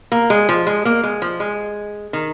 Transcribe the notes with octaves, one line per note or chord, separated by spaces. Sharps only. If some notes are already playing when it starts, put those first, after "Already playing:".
A#3
G#3
F3
G#3
A#3
G#3
F3
G#3
D#3